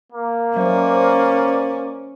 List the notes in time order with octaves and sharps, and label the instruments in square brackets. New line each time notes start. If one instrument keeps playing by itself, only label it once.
[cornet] A#3
[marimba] F#3 [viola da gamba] C#4 [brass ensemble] C5 D5